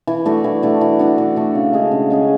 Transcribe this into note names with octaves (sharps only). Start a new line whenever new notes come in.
E3
A3 D4 F#4
E3
A3 D4 F#4
E3
A3 D4 F#4
E3
A3 D4 F#4
C#3
G#3 C#4 G#4
C#3
G#3 C#4 G#4